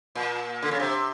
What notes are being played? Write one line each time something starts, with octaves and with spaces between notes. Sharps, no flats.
A#2
D3
C#3
C3